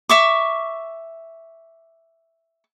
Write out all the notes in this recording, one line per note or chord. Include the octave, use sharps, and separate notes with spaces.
E5 C#6 D6